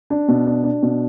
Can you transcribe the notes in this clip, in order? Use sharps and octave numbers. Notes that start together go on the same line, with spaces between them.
D4
B2
D4
D4
B2